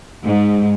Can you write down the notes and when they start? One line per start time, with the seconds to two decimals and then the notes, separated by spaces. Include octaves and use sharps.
0.24 G#2